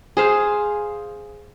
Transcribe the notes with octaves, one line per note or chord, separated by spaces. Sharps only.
G#4 C5 F5